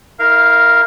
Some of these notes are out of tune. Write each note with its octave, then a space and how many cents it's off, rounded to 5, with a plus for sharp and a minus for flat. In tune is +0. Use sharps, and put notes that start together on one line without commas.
E4 -45 A#4 +0 F5 -15